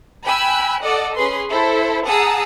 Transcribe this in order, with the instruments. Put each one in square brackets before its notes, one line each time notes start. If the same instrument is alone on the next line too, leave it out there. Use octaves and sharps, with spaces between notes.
[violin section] G5 G#5 B5 E6 F#6
A4 D5 D#5 F#5
C#4 G#4 B4 C6
E4 A4 C5
G#4 F#5 A5 A#5 D#6 E6